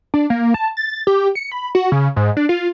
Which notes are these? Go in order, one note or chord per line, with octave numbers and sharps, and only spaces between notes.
D4
A#3
A5
A6
G4
C#7
B5
F#4
C#3
G#2
D4
F4